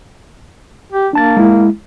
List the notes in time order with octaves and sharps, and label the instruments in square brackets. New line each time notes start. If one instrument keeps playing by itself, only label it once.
[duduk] G4
[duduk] A#3 [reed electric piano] D4 A5 A6
[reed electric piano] G#3 E4